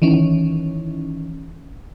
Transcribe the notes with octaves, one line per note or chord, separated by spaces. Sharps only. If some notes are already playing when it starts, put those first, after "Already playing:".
D#3 E3 C#4